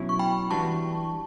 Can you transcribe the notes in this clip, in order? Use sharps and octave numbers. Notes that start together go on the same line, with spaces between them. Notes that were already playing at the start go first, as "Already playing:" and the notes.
Already playing: B2 F#3 C#4 E4
C#6
G5 B5
E3 G3 D4 F#4 B4 A5 C#6